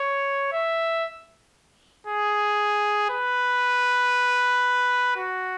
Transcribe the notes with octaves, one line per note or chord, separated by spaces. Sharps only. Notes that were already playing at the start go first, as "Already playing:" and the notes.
Already playing: C#5
E5
G#4
B4
F#4